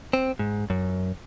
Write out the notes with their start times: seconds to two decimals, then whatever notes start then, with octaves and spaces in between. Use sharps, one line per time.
0.13 C4
0.39 G#2
0.70 F#2